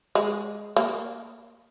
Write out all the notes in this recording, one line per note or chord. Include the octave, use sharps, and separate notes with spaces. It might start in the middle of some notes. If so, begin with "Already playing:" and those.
G#3
A#3